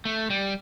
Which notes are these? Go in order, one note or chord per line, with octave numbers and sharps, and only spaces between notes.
A3
G3